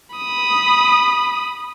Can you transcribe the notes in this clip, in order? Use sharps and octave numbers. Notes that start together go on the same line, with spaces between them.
B5 D#6